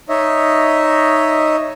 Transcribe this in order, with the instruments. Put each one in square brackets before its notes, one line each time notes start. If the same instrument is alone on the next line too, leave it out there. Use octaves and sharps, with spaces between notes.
[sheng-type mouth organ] D#4 C#5 D#5 E5